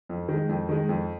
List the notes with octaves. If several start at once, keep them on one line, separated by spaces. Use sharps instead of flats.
F2
D#3 G#3
F2
D#3 G#3
F2